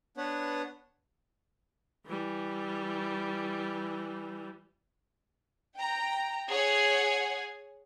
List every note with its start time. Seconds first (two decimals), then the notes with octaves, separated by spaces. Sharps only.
0.17 B3 D4 B4 C#5 F#5
2.06 E3 G3
5.77 G5 A#5
6.49 G#4 C#5 F#5 G#5